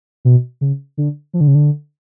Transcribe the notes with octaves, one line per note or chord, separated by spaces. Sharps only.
B2
C#3
D3
F3
D3
C#3
D3